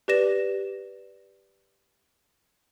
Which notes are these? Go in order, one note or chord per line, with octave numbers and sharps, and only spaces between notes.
G4 B4 D5 A#6 E7